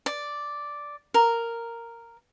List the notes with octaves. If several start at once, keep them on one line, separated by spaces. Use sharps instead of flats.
D5
A#4